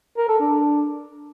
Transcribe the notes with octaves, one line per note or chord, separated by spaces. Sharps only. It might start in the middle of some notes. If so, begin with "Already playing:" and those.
A#4
A4
D4